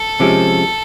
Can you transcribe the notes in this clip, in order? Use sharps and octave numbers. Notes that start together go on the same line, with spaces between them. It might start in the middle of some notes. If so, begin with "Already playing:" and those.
Already playing: A4
C3 F3 G#3 C#4